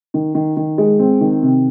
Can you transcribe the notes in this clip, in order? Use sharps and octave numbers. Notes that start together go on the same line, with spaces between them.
D#3
D#3
D#3
G#3
C4
D#3
C3